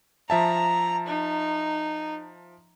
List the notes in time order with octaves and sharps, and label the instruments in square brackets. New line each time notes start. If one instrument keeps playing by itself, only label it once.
[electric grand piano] F3 E5 A5 [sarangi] A#5
[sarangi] D#4